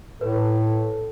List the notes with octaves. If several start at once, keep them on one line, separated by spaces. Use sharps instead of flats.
A2 A4 B4